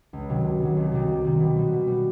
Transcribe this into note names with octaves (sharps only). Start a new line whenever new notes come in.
C#2
C3 D#3 F#3
C#2
C3 D#3 F#3
C2
C3 D#3 G3 C4
C2
C3 D#3 G3 C4
B2
G3 B3
B2
G3 B3